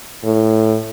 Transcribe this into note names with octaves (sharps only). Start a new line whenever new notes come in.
A2